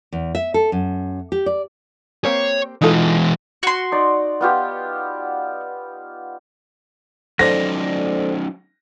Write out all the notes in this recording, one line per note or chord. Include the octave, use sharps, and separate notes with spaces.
E2
E5
A4
F#2
G4
D5
A#3 C4 G4 C#5
E3 G#3 D#4 F4 A4
F#4 C6
D#4 D5
B3 F4 G4
F#3 C#4 D#4 A4 C5 D5 A#6